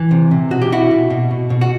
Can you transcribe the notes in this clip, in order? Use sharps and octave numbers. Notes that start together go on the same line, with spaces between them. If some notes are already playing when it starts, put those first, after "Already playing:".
Already playing: E3
C3
C3
B2 F#4
G4
B2 E4 F#4
B2
B2
B2
B2
F#4